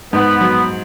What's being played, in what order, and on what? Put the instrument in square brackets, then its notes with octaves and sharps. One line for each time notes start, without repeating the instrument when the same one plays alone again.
[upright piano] G#2 [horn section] B3
[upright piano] F#3